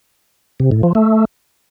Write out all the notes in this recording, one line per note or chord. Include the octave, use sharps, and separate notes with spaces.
C3
A2
F3
A3